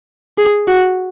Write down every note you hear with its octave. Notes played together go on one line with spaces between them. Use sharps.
G#4
F#4